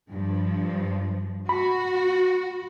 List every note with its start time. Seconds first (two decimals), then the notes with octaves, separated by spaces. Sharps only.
0.11 G2 F3
1.49 F#4 B5